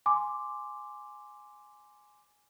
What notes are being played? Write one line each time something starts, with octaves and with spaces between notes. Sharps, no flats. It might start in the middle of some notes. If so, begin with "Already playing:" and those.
G#5 C6 D6